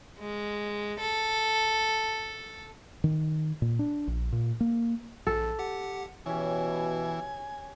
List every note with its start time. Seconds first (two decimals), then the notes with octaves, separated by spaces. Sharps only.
0.18 G#3
0.99 A4
3.04 D#3
3.62 A#2
3.79 D4
4.07 A#1
4.32 A#2
4.60 A#3
5.27 A#1 A4
5.59 G4 F#5
6.26 B2 E3 C#4 G4 G#5